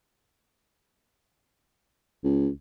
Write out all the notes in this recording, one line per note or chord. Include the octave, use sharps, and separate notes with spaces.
C#2